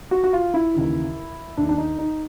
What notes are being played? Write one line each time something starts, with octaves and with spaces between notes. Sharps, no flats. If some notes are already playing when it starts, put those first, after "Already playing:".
F#4
F#4
F4
E4
D#2 C#3 E3
D#2 D#3 D4
D4
D#4
D#4